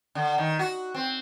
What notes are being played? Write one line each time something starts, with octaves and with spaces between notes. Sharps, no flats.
D3
D#3
F#4
C4